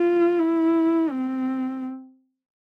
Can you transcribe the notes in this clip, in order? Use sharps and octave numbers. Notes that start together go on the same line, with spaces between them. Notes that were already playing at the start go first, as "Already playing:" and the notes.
Already playing: F4
E4
C4